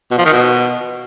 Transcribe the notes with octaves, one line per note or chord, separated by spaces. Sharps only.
B2
F3
D#3
B2